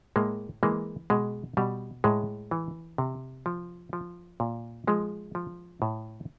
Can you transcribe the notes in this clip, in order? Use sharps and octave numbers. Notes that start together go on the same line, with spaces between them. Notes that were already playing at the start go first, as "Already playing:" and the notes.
A2 G#3 A#3
E3 G#3 A#3
B2 G#3
B2 G3
A2 G#3
E3
C3
F3
F3
A#2
F3 G#3
F3
A2